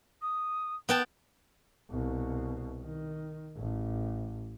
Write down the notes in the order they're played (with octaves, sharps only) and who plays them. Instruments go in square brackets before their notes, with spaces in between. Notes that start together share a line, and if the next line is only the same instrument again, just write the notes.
[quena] D#6
[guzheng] B3 G5 A5
[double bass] C2 B2
D#3
A1